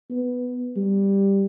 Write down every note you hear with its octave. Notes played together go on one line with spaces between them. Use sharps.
B3
G3